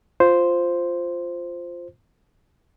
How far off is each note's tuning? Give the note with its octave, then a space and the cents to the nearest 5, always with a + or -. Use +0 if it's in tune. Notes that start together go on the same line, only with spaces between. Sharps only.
F4 +0 C5 +0